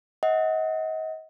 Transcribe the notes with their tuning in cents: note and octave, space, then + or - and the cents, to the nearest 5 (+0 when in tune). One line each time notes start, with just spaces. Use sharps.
D#5 +35 F#5 +0